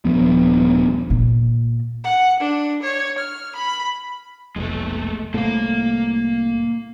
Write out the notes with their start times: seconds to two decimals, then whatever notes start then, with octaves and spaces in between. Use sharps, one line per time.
0.05 D#1 G2 F3 B3
1.10 A#2
2.04 F#5
2.40 D4
2.83 C#5
3.19 F6
3.56 B5
4.56 F1 B1 G#3 A3
5.34 C2 A2 A3 A#3 F5